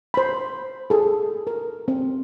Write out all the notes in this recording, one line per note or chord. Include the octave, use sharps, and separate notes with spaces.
C5 B5
G#4 A4
A#4
C4